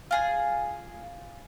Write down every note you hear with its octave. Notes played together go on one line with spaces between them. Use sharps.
F4 G#4 G#5